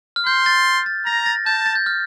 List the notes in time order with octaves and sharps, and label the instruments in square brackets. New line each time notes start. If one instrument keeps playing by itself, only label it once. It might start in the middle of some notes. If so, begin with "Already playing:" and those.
[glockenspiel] F6
[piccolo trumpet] C6 [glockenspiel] G6
[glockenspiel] A6
A6
[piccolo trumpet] A#5 [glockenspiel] A#6
[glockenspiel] A6
[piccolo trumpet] A5 [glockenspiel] G6
[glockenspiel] A6
G6
F6